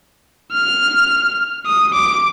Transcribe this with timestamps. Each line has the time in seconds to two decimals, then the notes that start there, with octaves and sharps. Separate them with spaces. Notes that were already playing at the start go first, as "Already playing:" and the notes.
0.53 F6
1.66 D#6
1.93 D6